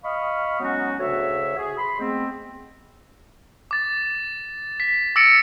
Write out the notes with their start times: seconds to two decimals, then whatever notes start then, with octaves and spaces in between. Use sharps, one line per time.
0.03 D#5 F5 B5 C#6 D#6 F6
0.60 F#3 G#3 B3 C#4 D#4 F#4
0.99 D2 C#3 F#4 C#5 E5
1.56 F#4 G#4
1.77 B5 C6
1.99 G#3 A3 B3 C4
3.71 D6 A6
4.80 B6
5.16 D6 E6 A6 A#6 C#7 D7